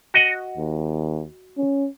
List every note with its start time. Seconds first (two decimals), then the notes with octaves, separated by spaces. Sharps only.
0.14 F#4 D#5 F#5
0.58 D#2
1.58 C#4